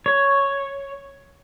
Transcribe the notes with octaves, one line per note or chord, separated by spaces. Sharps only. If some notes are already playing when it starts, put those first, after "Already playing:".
C#5